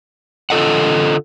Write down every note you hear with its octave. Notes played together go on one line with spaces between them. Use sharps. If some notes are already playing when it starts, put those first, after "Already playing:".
D3 F4 A4 D#5 F#5